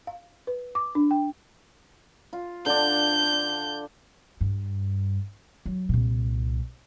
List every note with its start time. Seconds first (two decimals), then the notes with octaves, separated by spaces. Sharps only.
0.07 F5
0.47 B4
0.75 D6
0.95 D4
1.11 G5
2.33 F4
2.66 D3 D4 G6
4.41 G2
5.66 F#3
5.89 C2 A#2